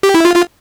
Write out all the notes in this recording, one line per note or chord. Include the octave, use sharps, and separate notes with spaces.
G4
E4
F4
F4